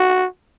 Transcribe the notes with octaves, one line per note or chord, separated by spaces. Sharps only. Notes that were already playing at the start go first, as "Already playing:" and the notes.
Already playing: F#4